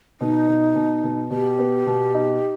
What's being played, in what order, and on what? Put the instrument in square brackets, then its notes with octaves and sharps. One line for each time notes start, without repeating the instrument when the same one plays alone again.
[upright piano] B2 [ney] D#4
[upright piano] B2
B2
B2
[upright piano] B2 [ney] G4
[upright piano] B3
B2
D#4